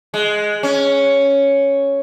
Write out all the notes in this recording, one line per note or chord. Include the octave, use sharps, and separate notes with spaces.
G#3
C#4